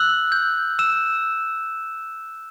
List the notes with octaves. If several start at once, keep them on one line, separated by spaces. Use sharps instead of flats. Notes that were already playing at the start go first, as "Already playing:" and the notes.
Already playing: E6 F#6 F#7
G6
E6 E7